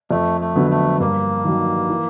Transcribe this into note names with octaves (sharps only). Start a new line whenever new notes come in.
F2 A3
A3
D3 F#3 B3
A3
G2 A#3
D#3 F#3
E3